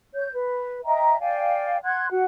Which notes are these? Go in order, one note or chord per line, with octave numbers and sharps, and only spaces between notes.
C#5 G6
B4
D#5 E5 G5 A#5
D5 F5 G5 G#5
F#5 C6 F#6 G#6
F#4 F#5